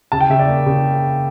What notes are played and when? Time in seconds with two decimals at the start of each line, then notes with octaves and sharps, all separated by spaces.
0.12 C#3 A5
0.20 G5
0.30 C#3 E5
0.39 D5
0.48 A#3
0.67 C#3